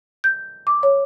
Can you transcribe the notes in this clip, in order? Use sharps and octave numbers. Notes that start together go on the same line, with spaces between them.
G6
D6
C#5